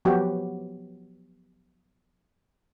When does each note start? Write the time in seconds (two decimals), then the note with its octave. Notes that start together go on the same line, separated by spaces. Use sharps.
0.05 F3 F#3 B3 F#4 G4